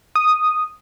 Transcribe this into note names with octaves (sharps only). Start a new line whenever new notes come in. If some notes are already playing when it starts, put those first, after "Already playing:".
D#6